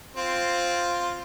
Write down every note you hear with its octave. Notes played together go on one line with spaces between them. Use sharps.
C4 F4